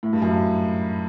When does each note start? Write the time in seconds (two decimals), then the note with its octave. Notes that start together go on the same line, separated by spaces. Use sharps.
0.03 A2
0.13 G2
0.22 F#2
0.30 G2